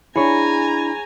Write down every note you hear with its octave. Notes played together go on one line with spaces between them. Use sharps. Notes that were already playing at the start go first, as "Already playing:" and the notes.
D4 E4 G#4 C#5 G#5 A#5 B5